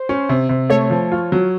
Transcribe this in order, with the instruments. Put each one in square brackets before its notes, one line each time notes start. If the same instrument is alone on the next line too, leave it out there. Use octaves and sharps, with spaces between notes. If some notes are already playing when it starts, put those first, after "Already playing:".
Already playing: [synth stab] C5
[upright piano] C#4
C3
C3
[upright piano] A3 [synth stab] C#5
[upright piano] F3
F4
F#3